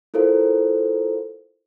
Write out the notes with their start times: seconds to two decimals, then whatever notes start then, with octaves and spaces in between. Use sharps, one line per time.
0.14 E4 F4 A4 A#4 C5 F5